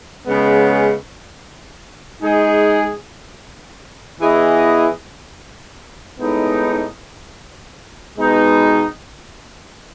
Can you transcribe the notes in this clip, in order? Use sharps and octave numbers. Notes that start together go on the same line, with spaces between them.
C#3 G#3 B3
G#3 D#4 G#4
E3 B3 E4 G#4 D#5
A2 G#3 B3 D#4
B2 G#3 B3 D#4